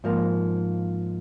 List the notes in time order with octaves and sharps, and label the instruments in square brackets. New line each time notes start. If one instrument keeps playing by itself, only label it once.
[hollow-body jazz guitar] G#2 F3 A#3